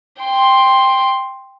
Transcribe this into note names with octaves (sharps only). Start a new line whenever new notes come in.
G5 C6